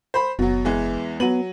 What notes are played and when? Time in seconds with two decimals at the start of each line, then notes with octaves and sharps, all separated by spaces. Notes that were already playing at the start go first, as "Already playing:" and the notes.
0.14 C5 B5
0.39 F#1 B2 F#3
0.65 E2 E3 G#3
1.20 F#3 B3 D#7 F#7